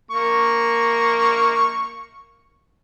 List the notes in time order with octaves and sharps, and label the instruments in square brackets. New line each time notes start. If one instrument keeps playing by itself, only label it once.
[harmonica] A#3 C#6